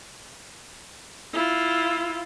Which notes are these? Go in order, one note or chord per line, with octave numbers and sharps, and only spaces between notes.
E4 F4